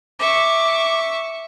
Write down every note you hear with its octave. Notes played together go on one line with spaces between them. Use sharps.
E5 C#6 D6